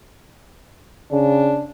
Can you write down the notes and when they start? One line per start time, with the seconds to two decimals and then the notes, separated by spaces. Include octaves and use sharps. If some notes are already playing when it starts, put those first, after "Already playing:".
1.11 C#3 D4